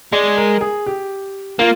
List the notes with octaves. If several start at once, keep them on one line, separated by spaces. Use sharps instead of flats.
G#3 D5
A#4
G#4
G4
A#3 F4